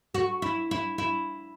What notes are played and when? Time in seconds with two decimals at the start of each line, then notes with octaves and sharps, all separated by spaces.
0.14 F#4
0.42 E4
0.71 E4
0.98 E4